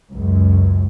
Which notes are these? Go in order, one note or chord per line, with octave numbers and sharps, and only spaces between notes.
C#2 F#2